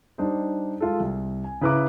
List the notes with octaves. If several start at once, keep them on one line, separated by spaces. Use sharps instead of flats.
G3 D4 D#4 C5
G#3 F4 A4
C2
G#5
C#3 E4 B4 A#5 D6